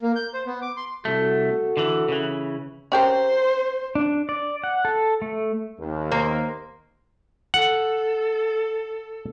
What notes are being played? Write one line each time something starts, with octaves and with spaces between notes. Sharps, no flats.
A#3
G6
C5
B3
D6
C6
C2 A3 F#4 A4
D3 E3
C#3 E3
C#4 G4 A#4 C5
D4
D5
F#5
A4
A3
D#2
A#3 C5
A4 F#5